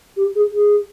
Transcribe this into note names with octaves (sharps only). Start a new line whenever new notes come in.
G4
G#4
G#4